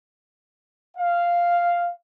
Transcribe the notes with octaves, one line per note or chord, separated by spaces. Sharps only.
F5